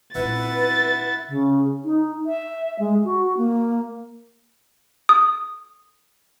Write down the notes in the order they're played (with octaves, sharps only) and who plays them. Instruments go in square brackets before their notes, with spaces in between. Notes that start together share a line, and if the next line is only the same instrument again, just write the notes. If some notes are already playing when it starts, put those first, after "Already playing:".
[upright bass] A#2 C4 [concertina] E4 E5 F#5 [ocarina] B4 [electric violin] A6
[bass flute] C#3
D#4
E5
G#3
F#4
A#3
[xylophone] D#6